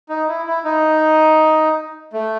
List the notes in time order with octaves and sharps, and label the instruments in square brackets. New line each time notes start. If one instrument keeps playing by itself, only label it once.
[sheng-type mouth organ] D#4
E4
E4
D#4
A3